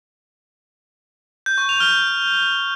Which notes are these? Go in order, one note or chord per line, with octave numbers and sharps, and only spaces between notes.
G6
C#6
F7
F6